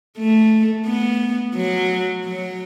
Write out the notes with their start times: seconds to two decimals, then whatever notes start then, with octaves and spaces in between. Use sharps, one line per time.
0.18 A3
0.86 B3
1.56 F#3
2.25 F#3